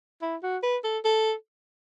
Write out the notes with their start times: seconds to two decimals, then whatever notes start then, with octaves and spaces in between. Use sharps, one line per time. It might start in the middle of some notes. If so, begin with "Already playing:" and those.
0.22 E4
0.43 F#4
0.63 B4
0.84 A4
1.05 A4